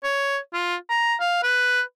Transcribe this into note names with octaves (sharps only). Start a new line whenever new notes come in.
C#5
F4
A#5
F5
B4